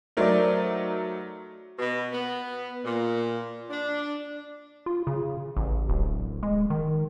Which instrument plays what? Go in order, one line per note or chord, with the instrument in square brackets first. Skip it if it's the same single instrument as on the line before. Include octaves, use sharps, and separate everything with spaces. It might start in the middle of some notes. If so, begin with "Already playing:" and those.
[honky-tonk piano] F#3 A3 D#4 [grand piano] A#4 C5 D5
[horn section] B2
B3
A#2
D4
[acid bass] F4
C#3
A1
D1
G#3
D#3